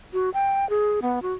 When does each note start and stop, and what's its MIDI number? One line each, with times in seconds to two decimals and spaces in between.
0.13 0.30 66
0.34 0.68 79
0.70 1.00 68
1.02 1.19 59
1.22 1.33 66